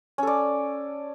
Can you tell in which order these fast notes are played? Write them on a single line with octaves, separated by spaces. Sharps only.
C#4 A4 D5